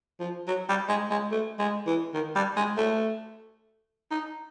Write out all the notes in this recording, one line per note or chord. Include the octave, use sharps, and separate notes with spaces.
F3
F#3
G3
G#3
G#3
A3
G#3
E3
D#3
G3
G#3
A3
D#4